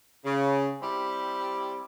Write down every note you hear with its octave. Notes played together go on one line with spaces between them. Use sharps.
C#3
G3 C4 E4 G4